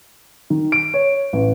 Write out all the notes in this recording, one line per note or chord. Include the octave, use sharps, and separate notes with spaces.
D#3
D7
C#5
A1